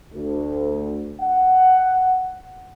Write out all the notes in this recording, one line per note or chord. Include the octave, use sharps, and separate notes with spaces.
D2
F#5